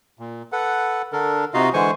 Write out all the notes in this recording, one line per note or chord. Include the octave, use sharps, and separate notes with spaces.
A#2
A4 B4 F#5
D3 D4 A4 A#4
C3 D#4 F4 F#4 D#5 F5
D3 E3 G#3 C5 G#5 C#6